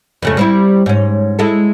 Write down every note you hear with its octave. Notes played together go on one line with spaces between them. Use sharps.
F2 C#3 A3
G3 C4 E4
G#2 C#4
G#3 E4 A4